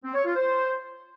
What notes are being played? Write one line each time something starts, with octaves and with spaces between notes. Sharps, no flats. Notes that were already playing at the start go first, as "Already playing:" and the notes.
C4
C#5
F4
C5